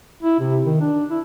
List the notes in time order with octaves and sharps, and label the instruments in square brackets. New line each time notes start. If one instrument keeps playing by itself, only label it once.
[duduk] E4
C3
D#3
D4
E4